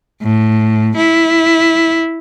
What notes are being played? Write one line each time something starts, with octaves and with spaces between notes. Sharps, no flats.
A2
E4